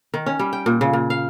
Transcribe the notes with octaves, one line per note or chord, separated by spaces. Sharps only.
D#3
C#4
G3
G5
A#2
C#3
A#2
F5